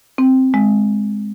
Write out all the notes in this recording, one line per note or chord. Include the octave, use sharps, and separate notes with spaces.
C4
G#3